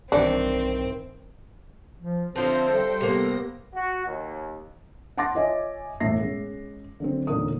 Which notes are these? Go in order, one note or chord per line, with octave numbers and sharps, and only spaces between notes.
B1 G2 D#3 E3 C4 D4
F3
D3 F3 C4 C5 E5 F5 A#6
G3 A4 G5
C3 A#3 B3 A#6
F#4
D#2
F#5 A5 C6 D6 A6 A#6
F4 C#5 D#5 E5 G#5
E1 A1 A2 E5 A#6 C7
G#3 C#4
D3 F#3 C4
E1 A#2 D3 D#4 A#4 D#6